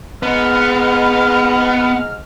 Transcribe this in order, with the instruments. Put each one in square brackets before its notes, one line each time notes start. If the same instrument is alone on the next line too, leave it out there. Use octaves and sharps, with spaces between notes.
[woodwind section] G#2 F6 [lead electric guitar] B3